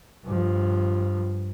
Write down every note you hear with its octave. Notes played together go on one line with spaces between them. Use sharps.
G2 F3